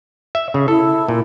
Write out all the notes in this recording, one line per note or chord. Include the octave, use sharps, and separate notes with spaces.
E5
C#3
E4 A4
A#2